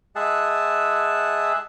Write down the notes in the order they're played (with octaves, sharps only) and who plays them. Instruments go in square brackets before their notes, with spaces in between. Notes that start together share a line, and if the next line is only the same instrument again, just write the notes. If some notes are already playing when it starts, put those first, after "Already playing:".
[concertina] G#3 G#4 E5 F#5 A5